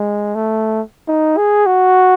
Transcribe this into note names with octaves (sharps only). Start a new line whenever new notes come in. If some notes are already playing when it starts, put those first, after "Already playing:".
Already playing: G#3
A3
D#4
G#4
F#4